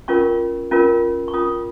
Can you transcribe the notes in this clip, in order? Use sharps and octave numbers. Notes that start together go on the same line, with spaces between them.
C#4 F4 A#4 C#6
C#4 F4 A#4
C#6
C#4 F4 A#4 D#6